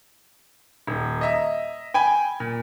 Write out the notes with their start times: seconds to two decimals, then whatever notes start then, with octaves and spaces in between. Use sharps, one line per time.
0.87 D#1
1.21 D#5 E5 A#5
1.94 G5 G#5 B5
2.40 A#2